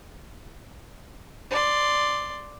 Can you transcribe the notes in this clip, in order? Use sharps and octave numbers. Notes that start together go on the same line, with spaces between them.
D5 C6